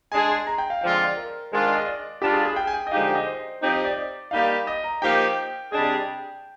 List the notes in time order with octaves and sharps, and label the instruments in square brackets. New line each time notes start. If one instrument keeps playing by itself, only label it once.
[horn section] G#3 D4 G#4 [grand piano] G#5
[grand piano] C6
A#5
G5
F5
[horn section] D3 F3 G#3 C4 F4 [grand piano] G5
[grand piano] F5
D5
A#4
[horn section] D#3 G#3 D4 F4 [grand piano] C5
[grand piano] D5
D#5
D5
[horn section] G3 D4 F4 [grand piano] G4
[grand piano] G#4
G#4
G5
G#5
G5
D#5
[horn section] D3 F3 G#3 D#4 G4 [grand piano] F5
[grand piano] D#5
C5
[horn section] F3 C4 D#4 G4 [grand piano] C5
[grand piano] D#5
D5
D5
[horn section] G3 A#3 D#4 G4 [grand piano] F5
[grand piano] D#5
A#5
[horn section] F3 A#3 D#4 G4 [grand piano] G5
[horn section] C3 G3 D4 G#4 [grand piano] D#5
[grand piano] G5
G5